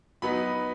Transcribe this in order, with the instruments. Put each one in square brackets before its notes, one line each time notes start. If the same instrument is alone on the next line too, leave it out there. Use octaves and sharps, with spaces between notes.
[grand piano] F#3 B3 D#4 B5